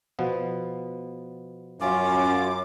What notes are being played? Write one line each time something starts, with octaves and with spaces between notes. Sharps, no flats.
B2 F3 B3
F#2 C#4 F4 D6